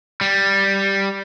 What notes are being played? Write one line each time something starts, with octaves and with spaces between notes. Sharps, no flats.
G3